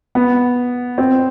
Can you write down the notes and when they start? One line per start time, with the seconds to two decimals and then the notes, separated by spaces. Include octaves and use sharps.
0.15 B3
0.98 C4